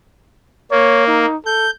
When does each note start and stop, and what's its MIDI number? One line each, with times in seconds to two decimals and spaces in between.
0.71 1.26 58
0.71 1.05 73
1.07 1.36 63
1.46 1.70 69
1.46 1.70 91